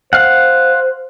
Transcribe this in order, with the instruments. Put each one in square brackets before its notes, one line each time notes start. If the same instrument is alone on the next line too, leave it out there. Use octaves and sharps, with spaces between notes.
[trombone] C5 [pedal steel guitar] F5 F#5